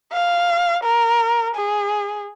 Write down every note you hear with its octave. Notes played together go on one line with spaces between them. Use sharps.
F5
A#4
G#4